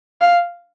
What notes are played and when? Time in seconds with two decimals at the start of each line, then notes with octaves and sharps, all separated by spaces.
0.21 F5